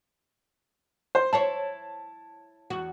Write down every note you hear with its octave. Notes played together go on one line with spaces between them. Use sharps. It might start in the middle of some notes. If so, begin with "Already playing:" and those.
C5
E4 C5 C#5 A5
E2 F#4